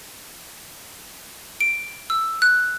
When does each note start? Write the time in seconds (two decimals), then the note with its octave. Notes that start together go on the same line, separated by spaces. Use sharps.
1.60 D7
2.10 E6
2.42 F#6